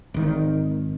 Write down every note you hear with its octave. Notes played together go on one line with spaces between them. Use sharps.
G#1 D#3